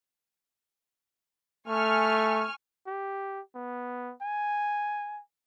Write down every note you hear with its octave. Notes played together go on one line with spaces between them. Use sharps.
A3 G#5 C#6 F6
G4
B3
G#5